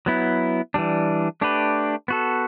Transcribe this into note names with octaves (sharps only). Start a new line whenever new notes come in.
F#3 B3 E4
E3 G3 D4
A3 D4 G4 B4
B3 F#4 A4